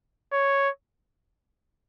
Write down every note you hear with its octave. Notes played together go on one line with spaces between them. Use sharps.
C#5